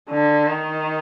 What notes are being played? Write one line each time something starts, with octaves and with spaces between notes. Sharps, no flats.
D3
D#3